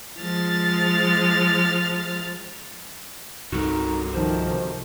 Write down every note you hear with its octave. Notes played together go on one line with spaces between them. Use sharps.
F3 G#3 F6 A6
C2 G2 D#4 F#4 A4 A#4
C3 D#3 F3 C5